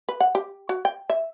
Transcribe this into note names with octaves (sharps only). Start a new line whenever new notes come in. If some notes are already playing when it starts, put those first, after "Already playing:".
B4
F#5
G4
F#4
G5
E5